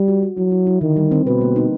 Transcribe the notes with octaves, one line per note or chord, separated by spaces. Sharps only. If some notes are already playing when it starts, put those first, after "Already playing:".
Already playing: G3
F#4
F#4
F#3 E4
E4
E4
D3 D#3
G3
C4
B2 B4
A#3
D#4